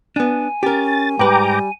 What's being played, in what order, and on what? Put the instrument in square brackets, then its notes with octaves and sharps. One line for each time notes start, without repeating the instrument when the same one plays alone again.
[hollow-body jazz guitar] B3 D4 [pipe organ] G#5
[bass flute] C#4 [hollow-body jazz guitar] G4 A#4 [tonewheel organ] A6
[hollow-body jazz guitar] G#2 B4 [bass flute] G3 [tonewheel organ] G5 A#5 D6